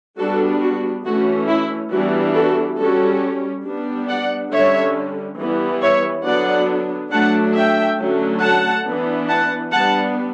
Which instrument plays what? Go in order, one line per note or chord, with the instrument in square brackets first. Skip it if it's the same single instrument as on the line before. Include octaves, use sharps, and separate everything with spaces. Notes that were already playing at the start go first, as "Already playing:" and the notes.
[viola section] G3 B3 D4 F#4 A4
F#4
E3 A3 C#4 F#4
E4
E3 G3 B3 D4 F#4
F#4 A4
G3 C#4 F#4 A4
G3 B3 D4
D5 F#5
D3 G3 C#4 C#5 E5
E3 G3 B3
C#5 E5
D3 F#3 B3 D4 D5 F#5
F#3 A3 D4 F#5 A5
E5 G5
D3 F#3 A3 C#4
F#5 A5
E3 B3 D4
F#5 A5
G3 B3 D4 F#5 A5